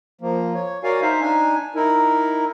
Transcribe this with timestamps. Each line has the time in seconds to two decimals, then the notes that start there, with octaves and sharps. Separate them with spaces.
0.21 F3 A#3
0.54 C#5
0.83 F#4 A#4 C#5 D5 F5 G#5
1.02 D#4 C5 E5 F5
1.21 D4 D#4 G#5
1.75 D#4 E4 A#4